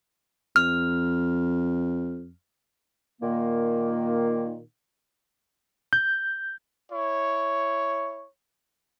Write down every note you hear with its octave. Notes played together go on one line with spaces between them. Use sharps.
F2 F6
A#2 D#3 A#3
G6
E4 C#5